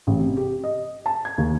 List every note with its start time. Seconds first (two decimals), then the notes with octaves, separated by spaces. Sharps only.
0.07 A1
0.19 C3
0.37 G4
0.64 D#5
1.06 A5
1.25 G#6
1.38 D#2